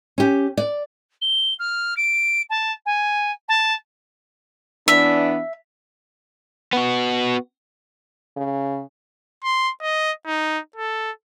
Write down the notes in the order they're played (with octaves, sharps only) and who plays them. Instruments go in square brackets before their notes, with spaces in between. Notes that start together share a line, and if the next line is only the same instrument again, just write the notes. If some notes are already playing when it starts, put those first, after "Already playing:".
[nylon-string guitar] C#4 G4
D5
[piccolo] G7
F6
D7
A5
G#5
A5
[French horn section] E3 B3 D4 [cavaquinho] E5
[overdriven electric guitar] B3 F#4
[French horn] C#3
[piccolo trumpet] C6
D#5
D#4
A4